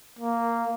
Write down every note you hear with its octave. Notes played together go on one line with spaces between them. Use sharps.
A#3